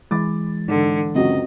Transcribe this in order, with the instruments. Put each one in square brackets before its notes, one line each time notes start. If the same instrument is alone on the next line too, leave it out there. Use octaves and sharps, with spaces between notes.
[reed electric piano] E3 G#3 [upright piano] B5 D6 A6
[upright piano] G#2 [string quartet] D3
[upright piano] C#2 F#2 [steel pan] C4 F#4 [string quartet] D#5